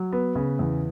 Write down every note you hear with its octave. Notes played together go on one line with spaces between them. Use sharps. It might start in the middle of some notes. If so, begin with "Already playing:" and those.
Already playing: F#3
B3
C#3
E2